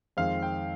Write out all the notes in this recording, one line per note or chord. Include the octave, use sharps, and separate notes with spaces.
F2 D#3 G#3 C4 F5
G5